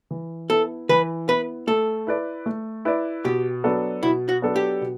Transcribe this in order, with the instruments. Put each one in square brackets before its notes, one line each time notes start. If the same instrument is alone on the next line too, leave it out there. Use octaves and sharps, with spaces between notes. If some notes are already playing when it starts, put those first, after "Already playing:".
[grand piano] E3
[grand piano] B3 E4 [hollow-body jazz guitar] A4
[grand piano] E3 [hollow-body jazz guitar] B4
[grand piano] B3 E4 [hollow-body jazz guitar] B4
[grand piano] A3 [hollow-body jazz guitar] A4
[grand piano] E4 B4 D5
A3
E4 B4 D5
[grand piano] B2 [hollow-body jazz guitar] G4
[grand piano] F#3 B3 D4 A4
[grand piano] B2 [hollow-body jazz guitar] E4
[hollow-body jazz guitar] F#4
[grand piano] F#3 B3 D4 A4
[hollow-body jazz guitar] G4
[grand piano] B2